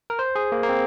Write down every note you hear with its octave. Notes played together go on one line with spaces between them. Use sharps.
A#4
C5
G#4
A#3
A#3
C4